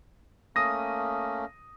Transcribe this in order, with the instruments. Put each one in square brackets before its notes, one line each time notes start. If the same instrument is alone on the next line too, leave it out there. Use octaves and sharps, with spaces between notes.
[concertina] A3 A#3 C#4 [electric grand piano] D#6 A#6